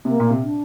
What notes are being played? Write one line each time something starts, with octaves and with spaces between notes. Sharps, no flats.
C3 A#3
A#2
C3
D4